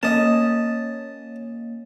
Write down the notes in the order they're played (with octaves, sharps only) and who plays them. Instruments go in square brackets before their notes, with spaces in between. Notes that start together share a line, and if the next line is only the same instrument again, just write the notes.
[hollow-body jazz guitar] A#3 C#4 [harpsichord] D#5 A5